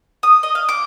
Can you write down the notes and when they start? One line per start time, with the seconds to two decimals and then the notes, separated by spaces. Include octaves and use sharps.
0.23 D#6
0.43 D#5
0.55 F5
0.69 D6